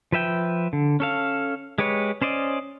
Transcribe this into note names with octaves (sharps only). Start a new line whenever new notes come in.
F3 B4 E5 G5
D3
C#4 A4 F5
G#3 G4 B4 C#5
C#4 C5 D5 D#5